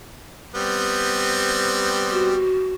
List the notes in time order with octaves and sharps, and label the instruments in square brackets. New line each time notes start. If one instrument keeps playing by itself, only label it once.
[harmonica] G3 B3 C4
[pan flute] F#4